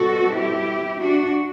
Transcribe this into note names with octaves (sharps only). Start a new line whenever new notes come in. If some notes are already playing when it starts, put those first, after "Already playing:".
Already playing: B2 G3 C4 F#4 A4
E4 G4
D4 F#4